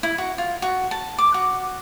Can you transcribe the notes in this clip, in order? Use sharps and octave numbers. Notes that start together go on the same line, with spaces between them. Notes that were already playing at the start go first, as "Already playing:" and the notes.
E4
F#4
F4
F#4
A5
D6
F#4